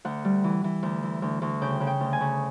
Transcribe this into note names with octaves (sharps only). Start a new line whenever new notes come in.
D2 F#5
G3
E3
E3
D2
E3
D2
D2
C#3 G5
C#3
G5
D2
G#5
C#3